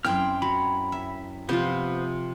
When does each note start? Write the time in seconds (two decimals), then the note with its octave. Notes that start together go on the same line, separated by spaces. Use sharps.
0.05 F#2 C4 E4 G5 C6 F6
0.42 F#3 B5
0.92 E5
1.49 C3 F3 B3 F4 C5